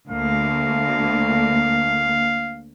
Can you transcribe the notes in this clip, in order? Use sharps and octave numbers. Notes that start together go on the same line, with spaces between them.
D2 A#3 F5